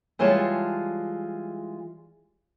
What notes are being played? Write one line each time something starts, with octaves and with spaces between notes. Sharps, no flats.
E3 G3 G#3 F4 C#5 A5